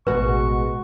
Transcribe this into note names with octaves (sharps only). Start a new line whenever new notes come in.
A1 B2 G#3 F#4 B4 C#6